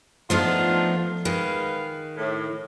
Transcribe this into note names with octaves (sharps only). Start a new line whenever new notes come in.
F3 A3 B3 D4 D#4 F4
D#3 G#3 B4 F5
A2